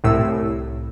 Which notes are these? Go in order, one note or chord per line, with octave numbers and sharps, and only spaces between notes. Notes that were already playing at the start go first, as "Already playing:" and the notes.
C2 A2 E6